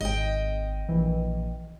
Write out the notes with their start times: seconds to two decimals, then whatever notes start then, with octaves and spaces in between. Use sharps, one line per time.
0.01 G#1 D#5 G5
0.89 A#1 E3